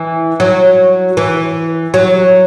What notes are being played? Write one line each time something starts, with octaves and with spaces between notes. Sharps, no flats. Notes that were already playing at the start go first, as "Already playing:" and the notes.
Already playing: E3
F#3
E3
F#3